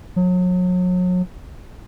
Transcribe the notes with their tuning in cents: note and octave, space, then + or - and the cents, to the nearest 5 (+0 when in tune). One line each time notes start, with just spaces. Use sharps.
F#3 -35